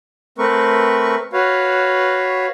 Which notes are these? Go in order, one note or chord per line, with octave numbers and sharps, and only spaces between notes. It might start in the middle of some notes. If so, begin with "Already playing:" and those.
A3 C4 A#4 B4 C#6
F#4 B4 C#5 F5